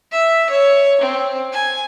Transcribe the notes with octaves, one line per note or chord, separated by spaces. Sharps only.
E5
C#5
C4
G#5